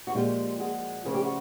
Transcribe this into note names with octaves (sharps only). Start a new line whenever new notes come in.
F#4
A#2 F3 G#3 F4 G4
F#4 G#4
D2 C#3 F3 G#4
G4
F#4